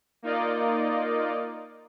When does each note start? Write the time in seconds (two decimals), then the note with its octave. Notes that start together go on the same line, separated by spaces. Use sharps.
0.22 A#3 D#4 F4 D5 D#5